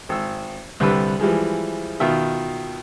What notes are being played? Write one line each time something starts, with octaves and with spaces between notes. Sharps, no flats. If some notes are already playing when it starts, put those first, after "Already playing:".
G#1 E6
C2 D3 G3 B4 E6
E3 F3 G3 G#3
B2 D#3 F4 E5